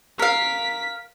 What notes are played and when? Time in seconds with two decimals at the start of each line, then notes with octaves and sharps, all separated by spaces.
0.19 A#4 F5 B6